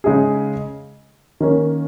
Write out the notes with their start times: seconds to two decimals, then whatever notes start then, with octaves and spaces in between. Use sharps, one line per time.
0.04 C#3 G#3 D#4 G#4
1.40 D#3 A#3 C#4